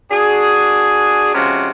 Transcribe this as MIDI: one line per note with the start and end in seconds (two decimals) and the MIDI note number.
0.11 1.34 62
0.11 1.34 66
0.11 1.34 68
1.35 1.71 48
1.35 1.71 53
1.35 1.71 56
1.35 1.71 61
1.35 1.71 66